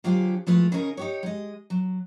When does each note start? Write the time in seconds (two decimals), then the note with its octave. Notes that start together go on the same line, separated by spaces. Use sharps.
0.04 D3 F#3 F4 G4 G#4 C5
0.47 F3 G#3 A3 E4 F4 B4
0.72 C#3 C#4 D#4 G#4 A#4
0.97 D#4 G4 C#5
1.23 G#3 D#5
1.70 F#3